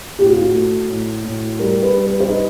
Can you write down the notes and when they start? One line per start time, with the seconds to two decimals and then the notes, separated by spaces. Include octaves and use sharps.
0.19 A2 G4
0.26 F#4
0.33 F4
0.42 F#4
0.55 A3
0.89 A2
1.25 A2
1.59 G3 A#4
1.82 B4
1.94 G3
2.07 B4
2.20 C5
2.29 D#4 B4